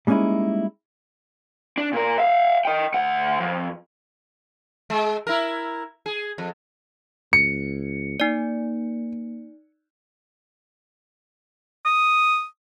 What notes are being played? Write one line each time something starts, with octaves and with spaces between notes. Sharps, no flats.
G3 G#3 A#3 C#4 D#4 E4
D4
A#2 A#4
E5 F5
D#5 G5
D2 F#5
F2
G#3
E4 A#4
G#4
F2
C#2 C#7
A#3 D#4 D5
D#6